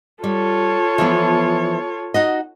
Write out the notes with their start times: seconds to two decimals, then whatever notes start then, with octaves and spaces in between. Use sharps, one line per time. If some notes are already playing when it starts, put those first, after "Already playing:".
0.24 G3 F4 A4 C#5
0.98 E3 F3 B3
2.14 D#4 F#4 D#5